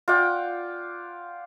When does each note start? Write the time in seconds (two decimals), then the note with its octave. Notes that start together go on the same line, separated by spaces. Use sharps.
0.08 F4 D5 F#5 G5